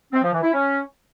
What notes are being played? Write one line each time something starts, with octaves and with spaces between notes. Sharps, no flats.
C4
F3
E3
E4
C#4